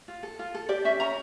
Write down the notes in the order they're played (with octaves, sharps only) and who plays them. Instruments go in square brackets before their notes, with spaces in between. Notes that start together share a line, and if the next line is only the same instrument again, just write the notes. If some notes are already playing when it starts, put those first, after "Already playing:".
[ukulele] F4
A4
F4
A4
G4 D5
C#4 E5
C#4 A#5